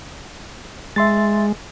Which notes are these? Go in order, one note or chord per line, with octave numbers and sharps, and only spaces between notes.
G#3 E5 C6 A6